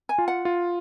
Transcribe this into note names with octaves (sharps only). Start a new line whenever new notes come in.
G#5
F4
F#5
F4